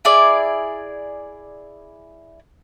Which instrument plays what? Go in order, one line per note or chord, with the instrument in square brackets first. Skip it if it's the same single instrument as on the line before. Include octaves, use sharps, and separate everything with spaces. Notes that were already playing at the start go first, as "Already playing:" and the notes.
[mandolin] E4 G#4 D5